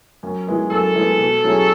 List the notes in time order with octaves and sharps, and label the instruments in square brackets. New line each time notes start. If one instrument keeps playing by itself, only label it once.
[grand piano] F#2
E3 G#3 B3
[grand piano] F#2 [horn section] A4
[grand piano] E3 G#3 B3
B2
F#3 C#4 E4 G#4